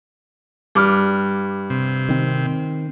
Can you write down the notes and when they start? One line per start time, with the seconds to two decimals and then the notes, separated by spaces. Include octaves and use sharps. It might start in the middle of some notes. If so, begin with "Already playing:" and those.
0.75 G2 D6 F6
1.70 C3
2.09 D#3 C4